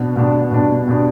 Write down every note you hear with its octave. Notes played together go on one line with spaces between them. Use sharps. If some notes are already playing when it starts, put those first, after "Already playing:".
Already playing: B2 B3 D4
B2 B3 D4
B2 B3 D4
B2 B3 D4